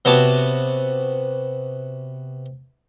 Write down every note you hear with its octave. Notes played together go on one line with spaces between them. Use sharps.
C3 B3 F#4 C#5 A5 D6